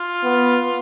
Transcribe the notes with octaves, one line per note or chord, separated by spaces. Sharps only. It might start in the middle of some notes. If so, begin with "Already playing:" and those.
Already playing: F4
B3